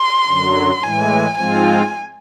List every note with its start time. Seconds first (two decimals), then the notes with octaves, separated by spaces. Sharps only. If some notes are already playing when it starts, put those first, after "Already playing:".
Already playing: C6
0.27 F#2 D3 F#3
0.82 A2 E3 G#3 G#5
1.38 G#2 F3 G#3 C4 F4 G#5